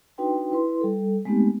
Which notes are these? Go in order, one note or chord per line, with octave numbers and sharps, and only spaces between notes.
D4 D#4 F#4 B4 G5 C6
E4 B4 C6
G3 A4
G#3 A3 B3 C4 D#4 G4